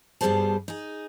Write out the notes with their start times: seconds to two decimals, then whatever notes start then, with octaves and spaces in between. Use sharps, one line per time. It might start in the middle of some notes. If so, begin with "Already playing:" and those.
0.21 G2 B2 G3 G#4 C5 A5
0.68 D#4 G#4